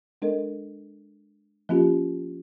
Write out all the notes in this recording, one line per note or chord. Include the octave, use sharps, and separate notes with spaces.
G#3 D4 A4 A#4 D#5
F3 A#3 C#4 F4 G4